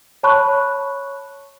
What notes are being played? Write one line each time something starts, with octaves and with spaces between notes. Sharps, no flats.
C#5 A5 B5 C#6 F#6